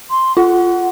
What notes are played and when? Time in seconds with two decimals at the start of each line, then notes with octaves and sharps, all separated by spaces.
0.10 C6
0.37 F4 F#5